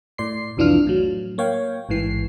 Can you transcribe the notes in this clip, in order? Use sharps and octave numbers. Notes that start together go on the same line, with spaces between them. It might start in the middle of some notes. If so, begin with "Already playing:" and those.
A2 D5 C6 C7
C2 F2 E3 D4 F4 F6
A2 F#3
A#3 C#5 F5 G5
A1 G#2 E3 C7